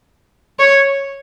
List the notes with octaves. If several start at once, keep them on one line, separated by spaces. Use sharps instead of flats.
C#5